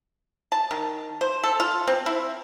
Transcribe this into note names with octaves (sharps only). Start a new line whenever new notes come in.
A5
D#3
C5
A4
F4
C4
E4